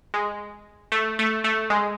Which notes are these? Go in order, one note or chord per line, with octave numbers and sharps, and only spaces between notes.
G#3
A3
A3
A3
G#3